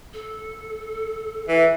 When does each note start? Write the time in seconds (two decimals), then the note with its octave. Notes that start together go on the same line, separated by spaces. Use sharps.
0.14 A4
1.48 E3